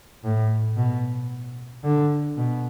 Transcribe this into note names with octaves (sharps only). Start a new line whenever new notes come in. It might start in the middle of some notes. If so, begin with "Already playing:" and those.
A2
B2
D3
B2